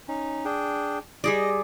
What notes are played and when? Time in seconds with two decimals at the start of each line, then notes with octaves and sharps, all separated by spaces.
0.08 C#4 D#4
0.45 D4 G#4 G5
1.24 G3 G#4 D5 D#5